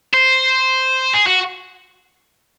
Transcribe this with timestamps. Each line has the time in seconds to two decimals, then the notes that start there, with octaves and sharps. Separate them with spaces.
0.14 C5
1.14 G#4
1.27 F#4